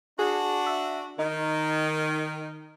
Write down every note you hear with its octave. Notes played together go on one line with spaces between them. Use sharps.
D4 F#4 G#4
E5
D#3 D#4